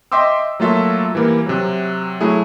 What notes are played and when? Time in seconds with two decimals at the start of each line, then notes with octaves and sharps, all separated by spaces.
0.12 D#5 E5 G5 C6 D6 E6
0.60 F#3 A3 A#3 F4 A4 E5
1.15 E3 G3 A#3
1.46 C3 F#3
2.21 F#3 A3 E4 G#4